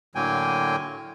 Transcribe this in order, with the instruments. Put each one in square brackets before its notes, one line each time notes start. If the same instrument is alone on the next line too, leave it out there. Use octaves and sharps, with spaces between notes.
[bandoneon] A2 D3 F#3 A#3 G5 G#5